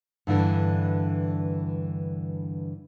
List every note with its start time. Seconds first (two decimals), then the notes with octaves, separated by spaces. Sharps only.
0.27 G2 D3 E3